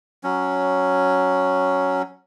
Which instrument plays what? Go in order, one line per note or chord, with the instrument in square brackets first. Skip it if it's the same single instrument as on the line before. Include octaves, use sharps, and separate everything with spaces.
[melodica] F#3 C#4